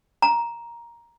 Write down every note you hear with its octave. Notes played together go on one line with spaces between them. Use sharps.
A#5